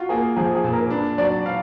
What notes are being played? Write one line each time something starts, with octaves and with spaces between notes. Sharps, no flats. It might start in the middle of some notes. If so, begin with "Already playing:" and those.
Already playing: F4 F#4
A#3 G#4
F3 G#4
G#4
A#2
A#4
D4 B4
F#3 D5
F5